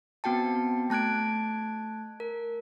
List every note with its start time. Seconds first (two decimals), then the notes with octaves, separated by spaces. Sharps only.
0.24 B3 C4 F#4 G5 A5
0.90 A3 A5 F#6 G#6 D7
2.20 A#4